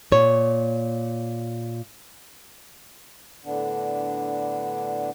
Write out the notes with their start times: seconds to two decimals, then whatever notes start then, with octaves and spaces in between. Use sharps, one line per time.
0.12 A#2 C#5
3.45 A2 D3 B3 D4